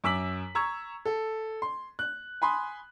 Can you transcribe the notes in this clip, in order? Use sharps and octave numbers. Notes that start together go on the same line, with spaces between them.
F#2 D6 E6 B6 F#7
A#5 C#6 E6 G#6
A4
C6
F#6
G#5 B5 C6 D#6